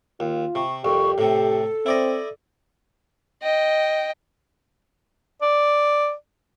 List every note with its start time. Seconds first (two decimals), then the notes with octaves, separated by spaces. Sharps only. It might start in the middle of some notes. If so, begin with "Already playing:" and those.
0.20 D#2 F4
0.55 C3 C#6
0.84 C2 F2 G4 C#6
1.18 A2 C3 A4
1.86 C4 E4 D5 D#5
3.42 D#5 G5
5.42 D5